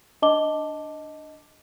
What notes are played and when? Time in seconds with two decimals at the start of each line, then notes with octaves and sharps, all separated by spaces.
0.22 D4 D#5 A5 D6 G7